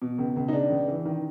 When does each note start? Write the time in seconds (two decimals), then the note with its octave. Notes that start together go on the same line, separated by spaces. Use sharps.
0.02 B2
0.18 C#2
0.36 C#2
0.48 D#4
0.53 C#3 D4
0.70 C#2
0.89 E3
1.05 D#3